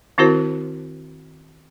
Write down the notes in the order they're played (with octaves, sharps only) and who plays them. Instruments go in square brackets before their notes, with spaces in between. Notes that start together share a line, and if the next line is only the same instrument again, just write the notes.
[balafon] D#3 C4 E4 F#4 A#4 C5